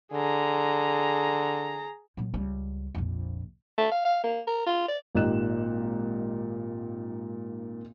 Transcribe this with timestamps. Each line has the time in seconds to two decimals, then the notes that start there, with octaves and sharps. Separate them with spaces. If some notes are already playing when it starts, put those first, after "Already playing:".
0.13 D3 G#4 A#5
2.17 A#2 F#3
2.34 C#2 G3
2.95 A#1 F2
3.78 A3
3.91 F5
4.05 F5
4.24 A#3
4.47 A#4
4.66 F4
4.88 D5
5.15 G#1 A#2 D#4 G4 F#6 E7